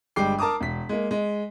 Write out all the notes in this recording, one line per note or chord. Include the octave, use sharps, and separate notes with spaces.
G1 G3 G#3 G5 D6 C7
A#4 A5 A#5 D6 D#6
E1 B6
G#3 A#3
G#3